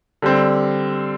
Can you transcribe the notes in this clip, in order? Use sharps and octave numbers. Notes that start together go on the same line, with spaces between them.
D3 G3 C4